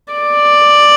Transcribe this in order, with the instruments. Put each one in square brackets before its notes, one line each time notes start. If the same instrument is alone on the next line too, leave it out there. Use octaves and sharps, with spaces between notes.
[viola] D5